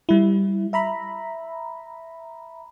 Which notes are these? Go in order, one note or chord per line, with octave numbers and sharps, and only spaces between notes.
G3 E4
E5 A#5 B5